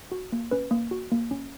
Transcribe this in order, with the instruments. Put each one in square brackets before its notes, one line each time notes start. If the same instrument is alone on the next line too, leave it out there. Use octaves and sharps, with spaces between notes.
[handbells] F#4
A#3
C#4 B4
A#3
F#4
A#3
C#4